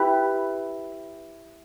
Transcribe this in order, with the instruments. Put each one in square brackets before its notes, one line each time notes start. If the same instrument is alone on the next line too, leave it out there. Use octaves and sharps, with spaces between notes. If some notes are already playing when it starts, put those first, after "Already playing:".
Already playing: [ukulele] E4 G4 B4 B5